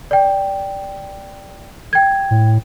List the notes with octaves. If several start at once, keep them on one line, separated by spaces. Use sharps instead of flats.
D5 G5
G5 G#6
A2